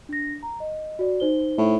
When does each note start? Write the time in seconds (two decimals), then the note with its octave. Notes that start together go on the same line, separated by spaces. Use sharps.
0.09 D4 A#6
0.43 A#5
0.60 D#5
0.99 F#4 D5
1.20 D#4 C5 G7
1.58 A2